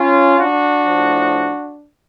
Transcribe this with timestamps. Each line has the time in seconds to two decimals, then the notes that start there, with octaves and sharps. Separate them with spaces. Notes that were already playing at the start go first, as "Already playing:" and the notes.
Already playing: C#4 F4
0.38 D4 F#4
0.86 A2 F3